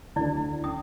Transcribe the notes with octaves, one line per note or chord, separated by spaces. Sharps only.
D2 D3 E4 D5
C#4 D#6